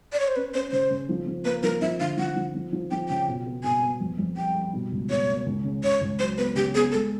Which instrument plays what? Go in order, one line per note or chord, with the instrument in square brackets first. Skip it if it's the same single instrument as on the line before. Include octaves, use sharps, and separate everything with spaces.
[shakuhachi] D5
C#5
C5
[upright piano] C#4 [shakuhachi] B4
[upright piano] C#4 [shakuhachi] C5
[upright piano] C#3 [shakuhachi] C5
[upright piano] C#3
F3
F3
[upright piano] A#3 [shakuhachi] B4
[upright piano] F3 [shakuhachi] A#4
[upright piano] F3 [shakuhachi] E5
[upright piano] D3 [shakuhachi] F5
[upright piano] F3 [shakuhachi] F#5
[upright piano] F3
F3
F3
[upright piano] F3 [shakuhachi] G5
[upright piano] C#3 [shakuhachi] G5
[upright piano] B2
B3
[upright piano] B2 [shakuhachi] G#5
[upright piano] B3
F2
F2
[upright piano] G3 [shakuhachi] G5
[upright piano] G3
B2
C#2
[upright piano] B2 [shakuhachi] C#5
[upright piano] A#3
C#2
C#3
[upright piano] C#3 [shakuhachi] C#5
[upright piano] C#2
[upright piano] F#3 [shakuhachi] C5
[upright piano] B3 [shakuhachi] B4
[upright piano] C#3 [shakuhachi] G4
[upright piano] B3 [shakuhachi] G#4
[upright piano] G#3 [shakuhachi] A4